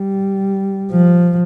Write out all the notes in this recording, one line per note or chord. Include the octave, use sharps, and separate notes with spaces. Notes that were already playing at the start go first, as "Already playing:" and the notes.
Already playing: G3
F3